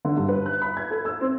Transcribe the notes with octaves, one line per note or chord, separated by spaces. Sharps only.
D3
G2
B4
F#6
B5
G#6
A4
E6
C4